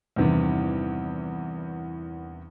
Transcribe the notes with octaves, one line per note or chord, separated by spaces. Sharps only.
E2 G2 C3 D#3 E3